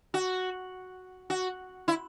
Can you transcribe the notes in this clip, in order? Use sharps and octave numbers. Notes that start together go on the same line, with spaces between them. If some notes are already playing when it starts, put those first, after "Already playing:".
F#4
F#4
E4